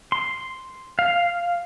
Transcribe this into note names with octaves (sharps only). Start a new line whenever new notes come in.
C6
F5